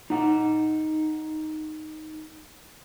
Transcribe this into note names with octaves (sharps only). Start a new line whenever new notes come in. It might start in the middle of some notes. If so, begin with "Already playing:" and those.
D#4 F#5